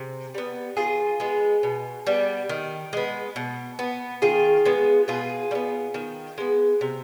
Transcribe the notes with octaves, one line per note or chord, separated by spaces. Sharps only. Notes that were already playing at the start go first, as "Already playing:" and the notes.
Already playing: C3 G#4
G3 B3
D#3 F4 G#4
G#3 B3
B2
G3 B3
D#3
G#3 B3
B2
B3
D#3 F4 G#4
G#3 B3
B2 F4 G#4
G3
B3
D#3
G#3 B3
C3